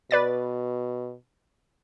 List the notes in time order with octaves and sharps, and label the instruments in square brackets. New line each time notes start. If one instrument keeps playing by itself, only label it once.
[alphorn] B2 [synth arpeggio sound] B4 D5 A6